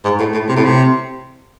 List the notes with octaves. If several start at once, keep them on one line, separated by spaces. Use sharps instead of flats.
G#2
A2
A2
C3
A2
C3